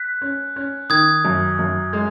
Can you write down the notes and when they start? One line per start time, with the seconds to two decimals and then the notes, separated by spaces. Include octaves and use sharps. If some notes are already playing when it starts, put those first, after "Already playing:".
Already playing: F#6 B6
0.22 C#4
0.56 C#4
0.90 D#3 D#6 G#6
1.25 F#2
1.59 F#2
1.93 G#3